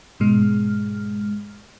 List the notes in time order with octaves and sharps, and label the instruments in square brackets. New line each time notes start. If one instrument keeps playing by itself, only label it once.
[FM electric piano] G#2 B2 G#3 F6